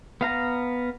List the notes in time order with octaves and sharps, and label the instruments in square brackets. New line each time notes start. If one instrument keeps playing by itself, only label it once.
[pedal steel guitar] B3 F5 A#5